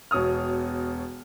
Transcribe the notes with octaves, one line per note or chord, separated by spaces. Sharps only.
E1 B2 C#5 D#6 F6